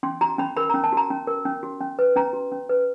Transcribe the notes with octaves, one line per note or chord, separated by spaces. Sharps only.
C#4 C6
F#4 A#5
C#4 B5
A#4 B5
C#4 A#5
A5
F#4 A#5
C#4
A#4
C#4
F#4
C#4
B4
C#4 A#5
F#4
C#4
B4